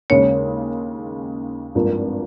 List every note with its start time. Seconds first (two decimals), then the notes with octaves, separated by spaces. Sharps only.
0.10 D#2 C#3 G#3 C#5
1.75 G#1 G2 F3 A#3